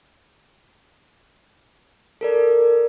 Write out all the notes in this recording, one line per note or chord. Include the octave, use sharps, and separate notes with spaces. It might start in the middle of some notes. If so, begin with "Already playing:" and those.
A4 A#4 D5